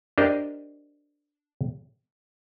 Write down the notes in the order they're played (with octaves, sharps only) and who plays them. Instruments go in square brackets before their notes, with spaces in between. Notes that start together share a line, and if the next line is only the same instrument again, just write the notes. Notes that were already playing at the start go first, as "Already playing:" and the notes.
[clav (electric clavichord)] D4 G4 A#4 C5 D#5